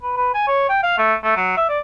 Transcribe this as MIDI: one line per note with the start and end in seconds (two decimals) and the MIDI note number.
0.03 0.15 71
0.17 0.29 71
0.34 0.43 80
0.47 0.65 73
0.69 0.79 79
0.83 0.97 77
0.98 1.14 57
1.24 1.35 57
1.36 1.53 54
1.57 1.64 76
1.69 1.79 74